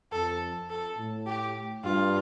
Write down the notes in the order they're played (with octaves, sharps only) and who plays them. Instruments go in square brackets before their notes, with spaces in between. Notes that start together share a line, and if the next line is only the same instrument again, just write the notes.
[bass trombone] F2 [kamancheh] A4
[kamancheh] A4
[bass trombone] A2
[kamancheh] G4
[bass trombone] G2 [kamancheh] F4